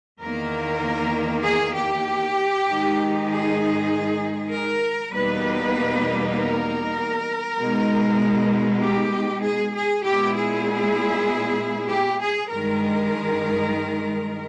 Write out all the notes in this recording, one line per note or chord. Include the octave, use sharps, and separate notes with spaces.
E2 D#3 A#3 A#4
G#4
G4
G#2 D#3 G#3 D#4
G#4
A#4
E2 B2 G3 A#3 D#4 B4
A#4
B2 G#3 D#4
G4
G#4
G#4
A#2 G#3 B3 E4 G4
G#4
G4
G#4
G2 D#3 G#3 A#4